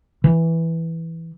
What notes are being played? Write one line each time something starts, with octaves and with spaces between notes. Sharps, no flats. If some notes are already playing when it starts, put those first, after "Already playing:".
E3